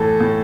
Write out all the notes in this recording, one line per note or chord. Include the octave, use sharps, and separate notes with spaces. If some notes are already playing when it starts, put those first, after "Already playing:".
Already playing: A2 E3 A4
A2